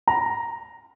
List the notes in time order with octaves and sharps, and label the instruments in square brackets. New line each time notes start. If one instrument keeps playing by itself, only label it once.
[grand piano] A#5